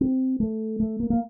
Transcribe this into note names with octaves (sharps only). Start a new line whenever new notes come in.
C4
A3
A3
A#3
A#3